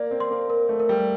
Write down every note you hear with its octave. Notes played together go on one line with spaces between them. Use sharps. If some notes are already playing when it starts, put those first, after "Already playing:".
Already playing: A#3 D5
C4
C6
A#3
A#4
A3
A#4
G3